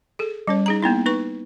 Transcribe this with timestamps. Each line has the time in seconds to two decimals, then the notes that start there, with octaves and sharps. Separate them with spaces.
0.19 G#4 A4
0.47 G3 C#4 C#5
0.66 D#4 G#4 A#5
0.83 A#3 B3 D#4 E4
1.06 D#4 B4 C#6